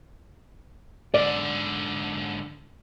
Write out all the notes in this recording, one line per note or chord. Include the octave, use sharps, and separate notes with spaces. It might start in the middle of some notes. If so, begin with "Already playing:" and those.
G#2 D3 D5